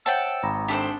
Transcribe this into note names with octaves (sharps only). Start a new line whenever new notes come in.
C5 C#5 E5 F#5 G5 A5 E6
G#1 A#5 B5 A#6
D4 G4 A4 C5